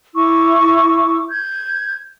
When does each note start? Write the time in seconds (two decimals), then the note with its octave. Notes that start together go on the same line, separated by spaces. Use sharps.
0.15 E4 C#6 D6 E6
1.28 G6 G#6